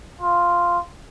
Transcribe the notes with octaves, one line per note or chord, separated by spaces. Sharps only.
F4